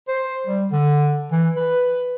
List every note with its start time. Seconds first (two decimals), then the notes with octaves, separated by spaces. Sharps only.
0.08 C5
0.47 G3
0.72 D3
1.32 E3
1.56 B4